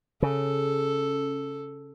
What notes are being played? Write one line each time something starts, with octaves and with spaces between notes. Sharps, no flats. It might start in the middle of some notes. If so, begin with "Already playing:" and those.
C#3 A4